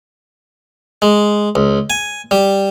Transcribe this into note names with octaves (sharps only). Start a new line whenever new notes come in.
G#3
C#2
G#5
G3